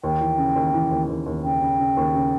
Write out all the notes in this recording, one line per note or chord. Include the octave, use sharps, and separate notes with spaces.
D#2 G5
E3
C#3
D#2
E3
D#2
D#2
D#2
C#3 G5
C#3
C#3
D#2
C#3